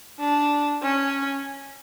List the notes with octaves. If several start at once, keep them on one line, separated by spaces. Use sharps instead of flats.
D4
C#4